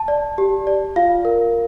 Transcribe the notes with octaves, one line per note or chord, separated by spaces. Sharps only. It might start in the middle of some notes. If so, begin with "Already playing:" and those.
Already playing: A5
D5
G4
D5
F4 F5
A#4